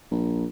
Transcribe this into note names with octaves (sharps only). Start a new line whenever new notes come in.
A#1